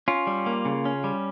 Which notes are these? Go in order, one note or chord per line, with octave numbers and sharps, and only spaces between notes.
C#4 F4
G3
A#3
C#3
C#4
G3